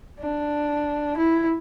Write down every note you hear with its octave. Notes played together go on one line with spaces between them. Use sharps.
D4
E4